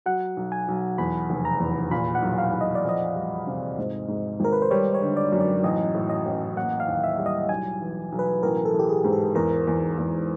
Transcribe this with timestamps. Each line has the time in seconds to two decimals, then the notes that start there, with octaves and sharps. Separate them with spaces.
0.06 F#3 F#5
0.37 B1
0.52 G#5
0.68 B1
0.98 E2 B5
1.30 F1
1.45 A#5
1.60 E2
1.91 A#2 B5
2.15 F#5
2.22 B1
2.38 F5
2.53 A#2
2.61 D#5
2.75 D5
2.85 F2 D#5
3.15 G3
3.47 C3
3.78 G#2
4.08 G#2
4.40 G#1 A#4
4.53 B4
4.62 C5
4.71 G3 C#5
4.95 C#5
5.02 D3
5.17 D5
5.32 F#2
5.40 D5
5.64 A1 D#5
5.95 A2
6.10 D#5
6.26 A1
6.56 A#3 F#5
6.80 F5
6.88 D#2
7.04 E5
7.18 G3
7.26 D#5
7.49 B1 G#5
7.81 E3
8.12 B1
8.19 B4
8.43 A1 A#4
8.65 A4
8.73 E3
8.79 G4
8.89 G#4
9.04 G#2
9.12 A4
9.35 E2 A#4
9.67 E2
9.98 E2